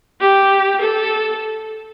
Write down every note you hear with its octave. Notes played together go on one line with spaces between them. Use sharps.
G4
A4